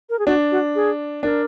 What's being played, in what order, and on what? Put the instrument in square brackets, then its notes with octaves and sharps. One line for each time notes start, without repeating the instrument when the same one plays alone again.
[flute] A#4
G#4
[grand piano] D4 [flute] F#4
[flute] F#4
G#4
[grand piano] D4 [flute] A#4